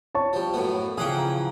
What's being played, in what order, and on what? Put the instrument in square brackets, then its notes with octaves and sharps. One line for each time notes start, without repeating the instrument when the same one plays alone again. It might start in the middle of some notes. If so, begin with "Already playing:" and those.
[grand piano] C#5 A5 C#6
[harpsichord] F3 G3
F#2 A2 B3
[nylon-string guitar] C#3 E3 F3 [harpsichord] G#4 F#5 G5 [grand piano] D#6
[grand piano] A#5